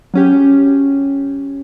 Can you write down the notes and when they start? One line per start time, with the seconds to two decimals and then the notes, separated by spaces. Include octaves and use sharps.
0.14 F#3 C#4 G4